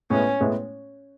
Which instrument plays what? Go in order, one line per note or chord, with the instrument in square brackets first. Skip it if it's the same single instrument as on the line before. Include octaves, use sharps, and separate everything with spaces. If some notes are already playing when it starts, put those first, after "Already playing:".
[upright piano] A2 G#3 B3 E4 [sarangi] C#4
[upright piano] A2 G#3 B3 E4